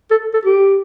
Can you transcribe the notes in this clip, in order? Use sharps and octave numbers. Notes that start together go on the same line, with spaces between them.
A4
A4
G4